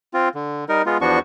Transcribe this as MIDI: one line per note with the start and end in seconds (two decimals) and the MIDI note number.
0.14 0.29 60
0.14 0.29 65
0.35 0.65 50
0.69 0.82 55
0.69 0.82 63
0.69 0.82 70
0.86 0.98 56
0.86 0.98 59
0.86 0.98 65
1.01 1.19 40
1.01 1.19 53
1.01 1.19 59
1.01 1.19 62
1.01 1.19 66
1.01 1.19 85